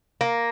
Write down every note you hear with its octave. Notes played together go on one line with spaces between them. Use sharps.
A#3